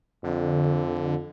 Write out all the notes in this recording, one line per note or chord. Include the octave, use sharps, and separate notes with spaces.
F2 D3